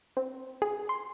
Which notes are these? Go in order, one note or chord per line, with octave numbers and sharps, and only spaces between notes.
C4
G#4
C6